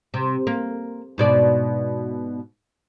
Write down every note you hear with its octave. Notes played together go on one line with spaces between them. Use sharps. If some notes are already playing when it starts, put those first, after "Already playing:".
C3
A#3
G#2 B2 D5